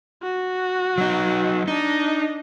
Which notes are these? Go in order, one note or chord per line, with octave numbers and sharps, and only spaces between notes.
F#4
F#3 D#4
D4 D#4 D#5